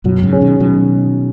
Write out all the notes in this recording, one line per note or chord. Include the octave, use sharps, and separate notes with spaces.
F#2 B2 F#3
G#2 C#3
C#4 G#4
B2 D#3
B2 D#3 F#3